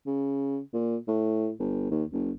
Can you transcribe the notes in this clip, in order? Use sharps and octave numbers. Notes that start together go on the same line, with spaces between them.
C#3
A#2
A2
G1
D#2
F#1